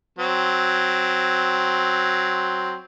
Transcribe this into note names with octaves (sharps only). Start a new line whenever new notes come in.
F#3 C4